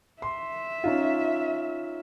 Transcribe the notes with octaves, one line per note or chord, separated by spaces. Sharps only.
E5 C6
C#4 D#4 F4